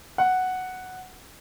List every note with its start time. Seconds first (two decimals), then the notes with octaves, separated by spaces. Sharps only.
0.18 F#5